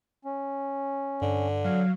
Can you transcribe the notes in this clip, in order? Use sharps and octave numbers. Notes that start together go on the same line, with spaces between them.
C#4
G2 D3
F#3 F5